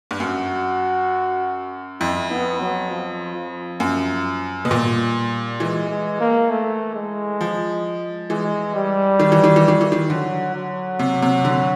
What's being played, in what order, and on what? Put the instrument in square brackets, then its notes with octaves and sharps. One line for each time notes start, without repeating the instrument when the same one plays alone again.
[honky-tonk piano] G2
[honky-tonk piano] F#2 [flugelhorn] F#4
[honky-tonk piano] F2 [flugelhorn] E4
[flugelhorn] B3
F#3
F3
F3
[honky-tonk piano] F#2
B2
[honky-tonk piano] A#2 [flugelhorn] G3
[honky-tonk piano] E3 [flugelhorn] G#3
[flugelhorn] G#3
A#3
A3
G#3
[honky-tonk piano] F3
[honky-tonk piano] E3 [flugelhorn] G#3
[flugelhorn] G3
[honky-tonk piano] D#3
E3
D#3
E3
D#3
E3
D#3
[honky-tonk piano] D3 [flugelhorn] F#3
[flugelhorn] F#3
[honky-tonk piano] C3
C3
D3